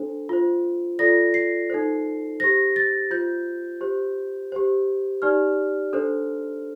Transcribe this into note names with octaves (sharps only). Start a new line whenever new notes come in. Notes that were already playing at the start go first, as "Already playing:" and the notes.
Already playing: D4 A4 C5
F4 C5
F4 A4 D5 A#6
C7
D#4 A4 C5
G4 C5 A#6
A6
F4 C5 G6
G4 C5
G4 C5
D#4 G4 D5 F6
D4 A4 C5